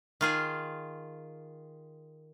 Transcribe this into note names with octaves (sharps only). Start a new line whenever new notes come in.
D#3 F4 G#4